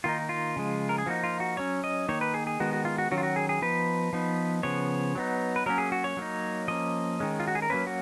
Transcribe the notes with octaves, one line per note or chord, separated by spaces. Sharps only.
D#3 A#3 D#4 F4
F4
C#3 F3 G#3
A#4
G#4
F3 A#3 D#4 F#4
F4
F#4
F#3 C#4 C#5
D#5
D#3 A#3 D#4 C#5
B4
G#4
G#4
D#3 G#3 B3 F#4
F#4
F4
F#4
D#3 F#3 C#4 F#4
F4
F#4
G#4
G#4
F3 B3 D#4 B4
F3 B3 D#4
C#3 F3 B3 C#5
F#3 B3 D#4
B4
F#3 A#3 C#4 A#4
G#4
F#4
C#5
F#3 A#3 D#4
F3 A#3 C#4 D#5
D#3 G#3 C#4
F4
F#4
G#4
A#4
F#3 A#3 C#4 B4
F#4